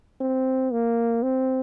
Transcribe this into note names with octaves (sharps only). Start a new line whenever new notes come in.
C4
A#3
C4